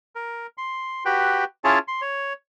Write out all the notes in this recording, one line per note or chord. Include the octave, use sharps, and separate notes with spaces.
A#4
C6
F#4 G4 B4 G5
C#4 E4 F4 G#4 C#5 A5
C6
C#5